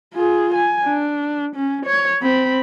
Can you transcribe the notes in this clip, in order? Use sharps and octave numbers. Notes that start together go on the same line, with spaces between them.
F4 G#4
G#5
D4
C#4
C#5
C4 B5